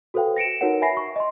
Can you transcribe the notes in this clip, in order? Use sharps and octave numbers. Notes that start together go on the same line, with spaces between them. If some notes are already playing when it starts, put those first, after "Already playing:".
F#4 A4 B4 C5 F5 G5
A#6 C#7 D7 E7
D#4 F#4 A#4 B4 C#5 F#5
E5 G#5 B5 A#6 C7
C#6
D#5 C6